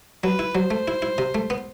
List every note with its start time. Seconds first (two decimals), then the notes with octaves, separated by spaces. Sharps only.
0.24 F#3 B4
0.39 E4
0.55 F#3 C5
0.71 A3
0.88 E4
1.02 E4
1.18 C3
1.35 A3
1.50 B3